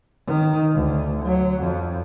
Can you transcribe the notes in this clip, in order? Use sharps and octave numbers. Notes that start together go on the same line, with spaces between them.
D#3
D2
F#3
F2